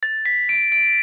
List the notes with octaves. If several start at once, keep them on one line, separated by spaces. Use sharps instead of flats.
A6
B6
D7
D7